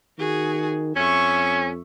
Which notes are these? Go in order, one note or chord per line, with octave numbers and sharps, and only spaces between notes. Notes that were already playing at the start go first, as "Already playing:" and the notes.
D#3 F#4 G#4
F2 C#4 E5 C#6